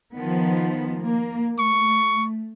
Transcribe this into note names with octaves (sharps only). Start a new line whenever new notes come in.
D#3 F3 B3
A#3
A3 C#6